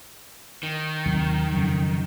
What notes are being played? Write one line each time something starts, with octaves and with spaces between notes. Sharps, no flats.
D#3
D#2 C3 F#3
F2 C#3 F#3